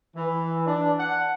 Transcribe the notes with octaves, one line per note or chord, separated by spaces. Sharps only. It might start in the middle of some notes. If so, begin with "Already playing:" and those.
E3
D4
F#5